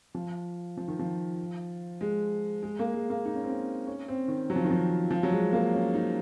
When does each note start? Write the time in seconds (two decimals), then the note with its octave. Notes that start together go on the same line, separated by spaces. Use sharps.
0.15 F3
0.77 F3
0.88 D#3
0.99 F3
2.01 G#3
2.63 G#3
2.79 A#3
2.94 G#3
3.10 A#3
3.25 D#4
3.35 C#4
3.43 C4
3.51 C#4
3.87 C#4
4.08 C4
4.28 D#3
4.50 F#3
4.56 F3
4.64 D#3
4.71 F3
5.11 F3
5.23 F#3
5.32 G#3
5.53 A#3
5.73 C#4
5.94 D#4